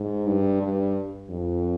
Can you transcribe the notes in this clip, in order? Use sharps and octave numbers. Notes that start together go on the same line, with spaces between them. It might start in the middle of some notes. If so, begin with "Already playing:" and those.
Already playing: G#2
G2
G2
F2